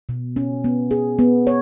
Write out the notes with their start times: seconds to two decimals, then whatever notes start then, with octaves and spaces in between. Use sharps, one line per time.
0.09 B2
0.36 C#4
0.64 B3
0.91 G#4
1.19 B3
1.47 C#5